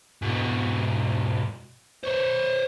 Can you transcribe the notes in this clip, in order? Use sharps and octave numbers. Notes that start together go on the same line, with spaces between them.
G#2 B2
C5 C#5